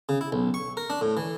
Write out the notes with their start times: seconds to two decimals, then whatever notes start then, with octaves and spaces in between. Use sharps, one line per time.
0.09 C#3
0.21 E4
0.32 B1
0.54 C#6
0.77 A#4
0.90 D4
1.01 A2
1.17 E3